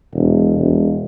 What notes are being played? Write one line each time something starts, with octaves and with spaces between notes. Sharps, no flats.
E1
E1